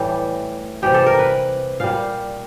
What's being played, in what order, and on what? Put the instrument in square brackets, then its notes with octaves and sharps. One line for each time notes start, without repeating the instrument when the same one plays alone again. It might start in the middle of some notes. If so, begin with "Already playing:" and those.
Already playing: [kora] A2 E3 G3
C3 E3 G3 G4
A4
A#4
B4
A#2 G3 F5